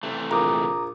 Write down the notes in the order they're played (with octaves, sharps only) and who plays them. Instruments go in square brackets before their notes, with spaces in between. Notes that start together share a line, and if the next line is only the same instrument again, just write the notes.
[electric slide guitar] C3 E3 A3
[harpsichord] A#1 [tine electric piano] A#5 D6 D#6